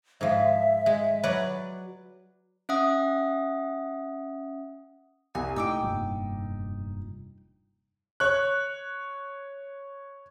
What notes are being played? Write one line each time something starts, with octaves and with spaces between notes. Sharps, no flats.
G#2 F3 E5
G#3
F#3 B4 D5
C#4 E5 F#5 D#6
C2 G#5
A2 D#4 G5 D6 E6
F1 G2 A#2
C#5 F#6